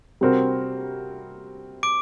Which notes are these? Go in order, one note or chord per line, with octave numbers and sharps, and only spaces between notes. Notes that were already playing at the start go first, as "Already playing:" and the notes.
C3 G3 C4 F#4 A#4
D6 D7